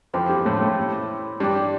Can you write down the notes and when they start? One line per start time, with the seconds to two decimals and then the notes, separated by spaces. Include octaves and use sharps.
0.13 F2 F3 C4 E4 G4
0.29 G2 G3
0.46 A2 A3
0.61 A2 A3
1.40 G2 G3 D4 G4 D5